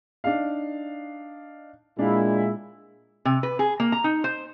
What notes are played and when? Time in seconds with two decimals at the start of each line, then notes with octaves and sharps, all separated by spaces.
0.24 D4 D#4 F5
1.99 A#2 G#3 D4 E4 F5
3.25 C3
3.43 B4
3.59 G#4
3.80 A#3
3.92 A#5
4.04 D#4
4.24 C5